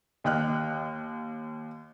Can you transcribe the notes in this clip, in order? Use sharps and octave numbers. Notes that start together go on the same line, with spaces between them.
D#2 D#5 G5 F6 F#6